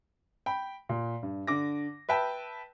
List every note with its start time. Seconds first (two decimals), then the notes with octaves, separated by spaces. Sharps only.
0.46 G5 B5
0.89 A#2
1.23 G2
1.47 D3 D6 A#6
2.09 B4 E5 G5 A5